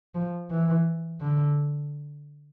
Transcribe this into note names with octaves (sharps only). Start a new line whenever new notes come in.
F3
E3
D3